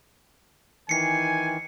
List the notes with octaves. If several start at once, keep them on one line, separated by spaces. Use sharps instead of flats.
D#3 E3 G#5 C7 C#7